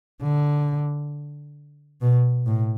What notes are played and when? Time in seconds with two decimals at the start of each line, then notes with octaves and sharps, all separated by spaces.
0.23 D3
2.02 B2
2.46 A2